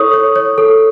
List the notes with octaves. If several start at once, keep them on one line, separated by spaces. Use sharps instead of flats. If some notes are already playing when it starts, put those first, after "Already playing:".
Already playing: E4 A4 C#5 C#6 D#6
C#5
C#5
A4